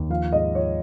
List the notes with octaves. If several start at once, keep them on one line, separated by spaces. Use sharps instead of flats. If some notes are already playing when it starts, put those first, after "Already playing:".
Already playing: D#2
F3 F5
G#2 D#5
F3 C#5